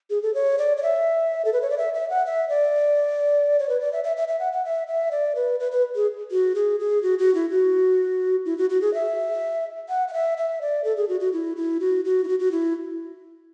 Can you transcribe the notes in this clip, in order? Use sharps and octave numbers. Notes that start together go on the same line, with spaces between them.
G#4
A4
C#5
D5
D5
E5
A4
B4
C#5
D5
E5
E5
F#5
E5
D5
C#5
B4
D5
E5
E5
E5
E5
F#5
F#5
E5
E5
D5
B4
B4
B4
G#4
F#4
G#4
G#4
F#4
F#4
E4
F#4
E4
F#4
F#4
G#4
E5
F#5
F#5
E5
E5
D5
A4
G#4
F#4
F#4
E4
E4
F#4
F#4
E4
F#4
F#4
E4